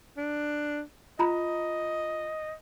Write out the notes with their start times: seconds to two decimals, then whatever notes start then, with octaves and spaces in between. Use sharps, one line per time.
0.17 D4
1.19 F4 D#5 A#5 B5